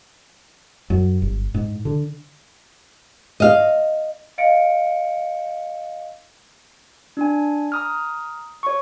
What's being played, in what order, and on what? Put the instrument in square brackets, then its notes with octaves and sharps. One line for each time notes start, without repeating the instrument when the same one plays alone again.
[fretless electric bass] F#2
G1
G#2
D3
[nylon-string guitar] D#5 F5
[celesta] D#5 F5 C#7 D7
[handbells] D4 G#5
A#5 D#6 F6
C#5 C#6